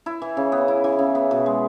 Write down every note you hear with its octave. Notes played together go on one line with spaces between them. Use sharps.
E4
E3
C#3
B3
E4
E3
C#3
B3
B2
G#3